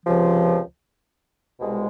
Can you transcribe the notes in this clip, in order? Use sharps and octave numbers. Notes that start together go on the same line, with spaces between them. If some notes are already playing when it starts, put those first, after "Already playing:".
C#2 C3 F3
C2 B2 G#3